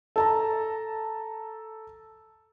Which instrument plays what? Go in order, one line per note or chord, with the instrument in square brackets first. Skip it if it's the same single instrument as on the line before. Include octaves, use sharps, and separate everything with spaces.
[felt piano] A4 A5 A#5